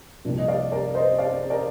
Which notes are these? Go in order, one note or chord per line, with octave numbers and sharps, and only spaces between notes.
C2 C3 F3 A#3 D4
D#5
D5 F5
A#4 D5
C5 D#5
D5 F5
A#4 D5